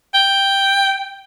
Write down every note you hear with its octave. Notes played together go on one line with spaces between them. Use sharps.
G5